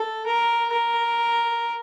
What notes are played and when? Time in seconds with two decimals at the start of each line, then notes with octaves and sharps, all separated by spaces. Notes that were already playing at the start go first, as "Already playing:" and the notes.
Already playing: A4
0.26 A#4
0.73 A#4